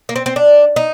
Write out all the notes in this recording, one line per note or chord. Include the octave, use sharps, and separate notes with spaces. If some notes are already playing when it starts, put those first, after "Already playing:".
A#3
C4
C4
D4
D#4